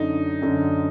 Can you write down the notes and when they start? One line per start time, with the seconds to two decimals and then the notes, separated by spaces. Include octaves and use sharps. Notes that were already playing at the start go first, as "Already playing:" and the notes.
Already playing: F#2 D3 D#4
0.42 F#2 D3